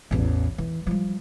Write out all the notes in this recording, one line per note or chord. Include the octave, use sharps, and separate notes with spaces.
A1 E2
E3
F3 G3